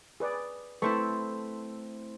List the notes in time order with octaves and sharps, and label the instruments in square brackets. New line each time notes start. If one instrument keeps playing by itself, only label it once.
[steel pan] G#4 B4 D5
[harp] A3 C4 E4 [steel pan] A4 B4 C#6